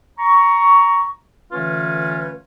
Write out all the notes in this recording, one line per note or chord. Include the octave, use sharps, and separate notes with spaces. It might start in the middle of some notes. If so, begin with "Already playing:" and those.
A#5 C#6
D3 E3 A3 C#4 F4 B4